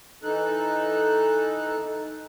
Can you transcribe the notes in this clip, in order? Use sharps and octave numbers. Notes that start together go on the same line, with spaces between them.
E3 D#4 A4 F#6